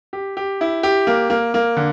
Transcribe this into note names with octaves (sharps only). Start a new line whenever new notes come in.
G4
G4
E4
G4
A#3
A#3
A#3
D3